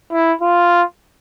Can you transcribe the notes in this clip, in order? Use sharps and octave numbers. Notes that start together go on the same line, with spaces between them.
E4
F4